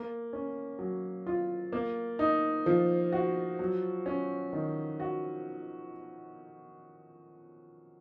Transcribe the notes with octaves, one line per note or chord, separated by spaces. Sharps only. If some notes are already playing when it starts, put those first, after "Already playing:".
Already playing: A#3
C#4
F#3
F4
A#3
D#4
F3
F#4
F#3
C#4
D#3
F#4